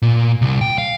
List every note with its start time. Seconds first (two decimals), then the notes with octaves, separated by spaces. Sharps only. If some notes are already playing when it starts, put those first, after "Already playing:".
0.02 A#2
0.42 C2
0.61 G5
0.78 F5